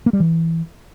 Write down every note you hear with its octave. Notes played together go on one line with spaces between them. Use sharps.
A#3
G3
E3